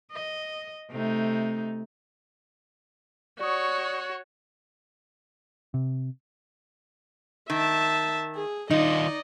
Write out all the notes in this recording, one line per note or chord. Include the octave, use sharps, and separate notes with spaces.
D#5
C3 A3 D#4
F#4 C#5 D5 C#6 D#6
C3
D#3 E5 A5
G#4
D#3 D#4 F4 D5 D#5